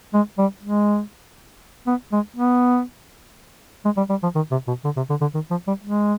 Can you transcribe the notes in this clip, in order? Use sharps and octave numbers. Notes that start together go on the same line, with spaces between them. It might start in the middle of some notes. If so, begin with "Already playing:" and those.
G#3
G3
G#3
B3
G#3
B3
G#3
G3
G3
F3
D#3
C3
B2
D3
C3
D3
D3
D#3
F3
G3
G#3